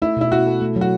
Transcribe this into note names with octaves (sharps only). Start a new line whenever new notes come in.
A3 E4
B2 E4
E4 F#4
A4
A3
F#3
F#4